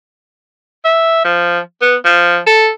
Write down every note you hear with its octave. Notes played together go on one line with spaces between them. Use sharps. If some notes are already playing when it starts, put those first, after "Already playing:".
E5
F3
B3
F3
A4